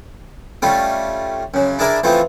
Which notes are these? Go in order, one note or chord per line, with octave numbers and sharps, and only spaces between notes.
G3 A3 C#4 F4
F#2 C#3
D4 E4 G#4 A#4 D5
E3 F3 A3 C4 F4